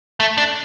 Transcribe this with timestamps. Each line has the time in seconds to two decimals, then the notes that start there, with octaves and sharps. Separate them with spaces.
0.20 A3
0.38 D4